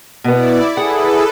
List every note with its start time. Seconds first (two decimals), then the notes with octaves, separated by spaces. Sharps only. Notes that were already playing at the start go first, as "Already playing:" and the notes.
0.24 B2 B3 E4 D5
0.77 E4 G#4 A4 B4 F#5